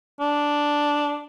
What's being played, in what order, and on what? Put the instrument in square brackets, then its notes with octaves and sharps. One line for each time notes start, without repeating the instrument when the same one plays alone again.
[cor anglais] D4